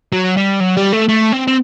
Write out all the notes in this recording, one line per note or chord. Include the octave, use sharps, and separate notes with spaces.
F#3
G3
F#3
G3
A3
A3
C4
C4